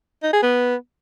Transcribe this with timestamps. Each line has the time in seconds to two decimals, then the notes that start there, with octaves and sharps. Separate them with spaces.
0.23 D#4
0.33 G#4
0.42 B3